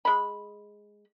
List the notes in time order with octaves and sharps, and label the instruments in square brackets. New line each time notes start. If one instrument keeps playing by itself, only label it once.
[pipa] G#3 B5